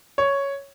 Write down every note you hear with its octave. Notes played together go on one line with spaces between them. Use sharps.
C#5